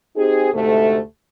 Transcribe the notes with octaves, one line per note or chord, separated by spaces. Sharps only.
C4 D#4 G4 G#4
D2 G#2 C3 A3